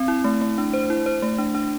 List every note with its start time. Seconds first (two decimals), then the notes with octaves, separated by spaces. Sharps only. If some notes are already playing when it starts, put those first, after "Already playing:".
Already playing: C4
0.08 E4
0.24 A3
0.41 A3
0.58 D4
0.73 C5
0.90 E4
1.06 C5
1.22 A3
1.38 D4
1.55 D4